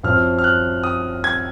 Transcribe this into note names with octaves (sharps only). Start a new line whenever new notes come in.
F#2 F3 C4 F6
F6
F#6
D#6
G#6